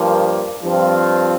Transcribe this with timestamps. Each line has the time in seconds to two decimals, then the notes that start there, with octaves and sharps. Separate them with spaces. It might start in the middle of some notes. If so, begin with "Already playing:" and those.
Already playing: G2 F3 A#3
0.62 G2 F3 C4 F4